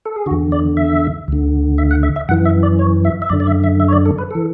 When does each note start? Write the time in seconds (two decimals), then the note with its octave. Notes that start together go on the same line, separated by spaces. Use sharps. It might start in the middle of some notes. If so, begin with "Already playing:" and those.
0.05 A4
0.16 G#4
0.26 D3 F#4
0.31 E2
0.52 D5
0.77 E5
1.28 D2 D3
1.78 E5
1.91 F#5
2.03 E5
2.16 E5
2.29 F#2 E3 F#5
2.45 E5
2.63 D5
2.79 C#5
3.05 E5
3.22 E5
3.29 F#2 D3 D5
3.40 D5
3.47 E5
3.64 E5
3.80 E5
3.88 C#5
3.93 D5
4.06 A4
4.18 B4
4.31 E3 A4